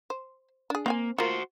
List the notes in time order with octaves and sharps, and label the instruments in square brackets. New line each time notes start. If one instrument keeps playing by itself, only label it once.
[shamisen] C5
D4 G#4
[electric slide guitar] A#3 [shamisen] C4 G5 G#5
[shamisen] A#3 F4 [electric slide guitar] F#4 C5